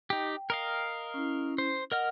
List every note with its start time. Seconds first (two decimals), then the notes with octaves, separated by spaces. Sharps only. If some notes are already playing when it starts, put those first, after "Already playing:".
0.10 D#4 G4 G5
0.50 A#4 D#5 F5
1.14 C#4 E4
1.58 C5
1.92 A#4 D#5 F#5 F6